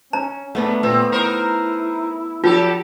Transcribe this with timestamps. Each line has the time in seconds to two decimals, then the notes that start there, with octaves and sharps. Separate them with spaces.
0.13 C#4 A#5
0.55 G#2 A3 B3 D4 A#4
0.83 A#2 B3 C4
1.12 D#4 E4 A#4 C5
2.44 F3 F#3 F4 G4 A4